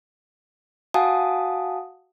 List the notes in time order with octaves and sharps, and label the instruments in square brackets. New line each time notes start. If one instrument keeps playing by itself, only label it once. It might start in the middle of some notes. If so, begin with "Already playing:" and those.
[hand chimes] F#4 F5 F#5 G#5 A5 D#6